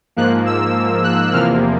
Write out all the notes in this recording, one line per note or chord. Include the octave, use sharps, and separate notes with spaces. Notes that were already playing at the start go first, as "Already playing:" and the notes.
G#2 F3 A#3 F#6
E6
F#6
E2 C3 F3 A#3 F6